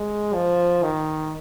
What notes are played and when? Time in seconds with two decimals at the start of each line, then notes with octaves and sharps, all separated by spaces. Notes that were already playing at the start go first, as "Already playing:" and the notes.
Already playing: G#3
0.34 F3
0.83 D#3